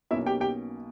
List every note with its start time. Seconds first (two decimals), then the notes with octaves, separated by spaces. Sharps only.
0.11 B1 B2 A#3 C#4 E4 E5
0.26 G4 G5
0.41 G4 G5